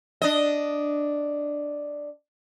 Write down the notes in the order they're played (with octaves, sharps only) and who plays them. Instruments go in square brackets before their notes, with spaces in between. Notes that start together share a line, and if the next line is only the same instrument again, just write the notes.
[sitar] D4 D#5